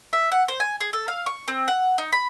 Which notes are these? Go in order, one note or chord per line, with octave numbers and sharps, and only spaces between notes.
E5
F#5
C5
G#5
G#4
A4
F5
C#6
C4
F#5
D#4
B5